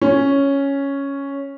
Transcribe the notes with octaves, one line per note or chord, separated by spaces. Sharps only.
C#4